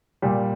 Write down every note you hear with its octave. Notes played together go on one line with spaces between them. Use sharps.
A#2 G3